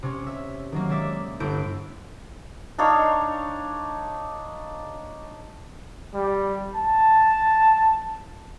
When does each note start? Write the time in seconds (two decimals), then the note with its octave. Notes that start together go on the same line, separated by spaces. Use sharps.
0.03 C3 C#4
0.26 E5
0.72 D#3 F#3 A#3
0.90 G#3 D5 E5
1.40 G1 E4 G6 D7
2.79 D4 D#4 C#5 F5
6.14 G3
6.76 A5